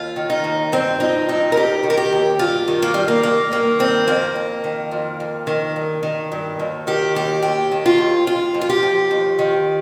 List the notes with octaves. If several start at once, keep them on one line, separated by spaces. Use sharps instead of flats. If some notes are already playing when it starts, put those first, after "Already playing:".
Already playing: D#2 F4
D#3
D#4
D#2
G2 C4
F3 D#4
G2 D#4
A#4
D#2 G4
D#3
A#4
G4
D#2
G2 F4
D#3
A#3
G2 G3
A#3
G2 A#3
D#3 A#3
G2 C4
F2 A#3
F2
D#3
F2
F2
D#3
G2
D#3
G2
D#2
D#3 G4
D#2 G4
D#2 G4
D#3
F4
D#2
F2 F4
F2
F4
G4
F3
D#2
D#3